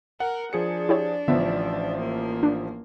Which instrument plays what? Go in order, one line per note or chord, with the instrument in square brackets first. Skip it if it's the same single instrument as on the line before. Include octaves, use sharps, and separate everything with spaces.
[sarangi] A#4 [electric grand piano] F#5
[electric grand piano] F3 G#4 C#7 [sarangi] D4
[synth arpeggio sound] E4 G4 C#5
[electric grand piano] A1 F3 E5 [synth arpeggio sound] D3 B3
[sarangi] A#3
[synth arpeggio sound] D4